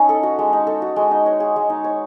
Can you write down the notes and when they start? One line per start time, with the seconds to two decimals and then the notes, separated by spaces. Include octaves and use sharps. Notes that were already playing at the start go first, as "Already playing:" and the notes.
Already playing: C#4 D#4 C#5
0.09 A4
0.23 F#4
0.39 G#3
0.53 D#4
0.67 A4
0.82 F#4
0.96 G#3
1.11 D#4
1.26 C#5
1.40 G#4
1.56 G#3
1.70 D#4
1.84 C#5